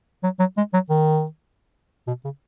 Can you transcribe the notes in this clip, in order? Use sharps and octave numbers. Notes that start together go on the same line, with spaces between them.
F#3
F#3
G#3
F#3
D#3
B2
C#3